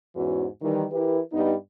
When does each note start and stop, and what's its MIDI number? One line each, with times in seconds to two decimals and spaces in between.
0.16 0.45 40
0.16 0.45 44
0.16 0.45 52
0.16 0.45 61
0.16 0.45 66
0.62 0.84 51
0.62 0.84 52
0.62 0.84 55
0.92 1.19 52
0.92 1.19 64
0.92 1.19 67
0.92 1.19 70
0.92 1.19 71
1.33 1.54 43
1.33 1.54 55
1.33 1.54 59
1.33 1.54 63